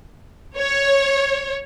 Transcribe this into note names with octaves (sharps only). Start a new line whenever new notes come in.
C#5